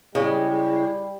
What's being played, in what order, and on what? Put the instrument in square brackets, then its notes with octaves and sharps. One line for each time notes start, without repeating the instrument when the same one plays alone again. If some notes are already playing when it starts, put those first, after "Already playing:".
[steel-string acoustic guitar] C#3 [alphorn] G3 [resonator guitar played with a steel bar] G#3 [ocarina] E4